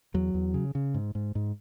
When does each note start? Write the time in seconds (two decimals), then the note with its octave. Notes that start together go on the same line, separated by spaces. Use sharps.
0.14 E2 F#3
0.34 E2
0.54 C#3
0.75 C#3
0.94 G#2
1.15 G#2
1.35 G#2